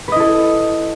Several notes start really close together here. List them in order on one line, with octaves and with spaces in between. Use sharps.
B4 D#5 E4 A4